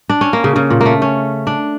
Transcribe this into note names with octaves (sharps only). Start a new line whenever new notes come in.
D4
C#4
A#3
C#3
C#3
A#2
A3 A#3
C#4
D4